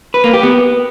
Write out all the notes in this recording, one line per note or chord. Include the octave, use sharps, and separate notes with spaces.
B4
A#3
G4
B3